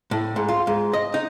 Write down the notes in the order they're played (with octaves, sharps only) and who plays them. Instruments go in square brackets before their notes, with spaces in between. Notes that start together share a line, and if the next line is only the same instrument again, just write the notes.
[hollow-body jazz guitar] A2
G#2
F4
G#2
D#5
D#4